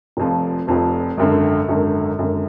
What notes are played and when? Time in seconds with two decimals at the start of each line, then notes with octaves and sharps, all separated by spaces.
0.17 F1 F2 F3
0.67 F1 F2 F3
1.18 G#1 F#2 D3
1.68 G#1 F#2 D3
2.19 G#1 F#2 D3